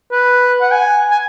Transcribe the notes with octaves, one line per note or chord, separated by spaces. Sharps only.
B4
F#5
G#5
G#5